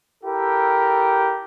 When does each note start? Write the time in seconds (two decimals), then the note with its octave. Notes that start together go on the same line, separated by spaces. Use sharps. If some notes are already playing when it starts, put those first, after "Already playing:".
0.24 E4 G4 A4 A#4